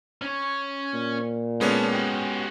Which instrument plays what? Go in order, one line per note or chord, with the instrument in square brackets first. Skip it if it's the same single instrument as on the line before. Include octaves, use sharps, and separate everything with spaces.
[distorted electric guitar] C#4 C#5
[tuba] A#2
[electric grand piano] G#3 B3 C#4 [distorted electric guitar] A4 D5
[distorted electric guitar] F#4 G4